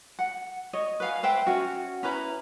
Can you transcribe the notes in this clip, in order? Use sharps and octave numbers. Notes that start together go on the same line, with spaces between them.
F#5
C#5 D#5
B4 F5 G#5
B4 C5 E5 G5
C#4 F#4
C#4 E4 B4 A#5